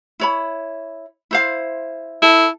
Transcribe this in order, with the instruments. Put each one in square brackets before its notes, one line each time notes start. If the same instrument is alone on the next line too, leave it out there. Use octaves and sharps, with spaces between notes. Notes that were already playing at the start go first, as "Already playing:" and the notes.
[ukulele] E4 C#5 B5
E4 C5 F5
[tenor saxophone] E4 [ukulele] A4